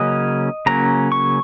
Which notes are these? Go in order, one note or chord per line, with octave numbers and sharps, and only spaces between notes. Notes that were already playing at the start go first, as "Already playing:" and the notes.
Already playing: C#3 F#3 A#3 C#4 D#5
C#3 F#3 A#3 C#4 A#5
C#6